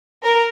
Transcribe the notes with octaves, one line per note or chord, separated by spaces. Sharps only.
A#4